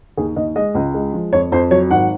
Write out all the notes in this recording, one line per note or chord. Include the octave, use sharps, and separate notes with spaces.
D#2 G#4
D#2 D#5
G#3 D#5
C#2
G#3
F3
F2 C#5
F2 C5
F#3 C#5
G#1 F#5